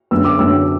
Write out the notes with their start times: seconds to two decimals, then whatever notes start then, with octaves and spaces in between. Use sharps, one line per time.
0.11 F#2 D3 F#3 B3 E6
0.25 D6
0.39 F#2 D3 F#3 B3 E6